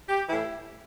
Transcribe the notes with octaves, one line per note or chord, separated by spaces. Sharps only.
G4
A2 E3 E4